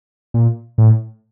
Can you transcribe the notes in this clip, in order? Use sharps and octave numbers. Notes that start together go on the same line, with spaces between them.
A#2
A2